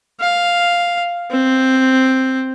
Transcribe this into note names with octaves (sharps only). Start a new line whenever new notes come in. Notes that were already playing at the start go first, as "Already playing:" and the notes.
F5
C4